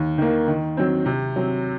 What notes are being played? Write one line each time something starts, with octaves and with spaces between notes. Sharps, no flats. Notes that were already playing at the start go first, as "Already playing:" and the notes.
Already playing: D#2
D#3 A#3
D#3
F#3 C4
C3
F#3 C4